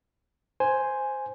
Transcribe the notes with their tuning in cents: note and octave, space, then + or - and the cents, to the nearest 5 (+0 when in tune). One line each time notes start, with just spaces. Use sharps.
C5 +0 G#5 +0